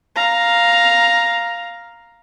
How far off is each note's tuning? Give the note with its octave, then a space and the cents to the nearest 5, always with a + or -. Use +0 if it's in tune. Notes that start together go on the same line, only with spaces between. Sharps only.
F5 +0 A#5 +5